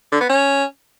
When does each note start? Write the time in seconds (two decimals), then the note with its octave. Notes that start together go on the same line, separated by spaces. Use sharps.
0.12 D3
0.21 B3
0.29 C#4